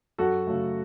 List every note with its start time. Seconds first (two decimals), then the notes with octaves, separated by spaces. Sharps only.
0.18 F#2 F#4 A4
0.47 C#3 F#3 A3